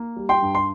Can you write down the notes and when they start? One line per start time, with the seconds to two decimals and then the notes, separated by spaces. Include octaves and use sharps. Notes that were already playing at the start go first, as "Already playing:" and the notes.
Already playing: A#3
0.16 G3
0.29 G5 C6
0.42 G2
0.55 C6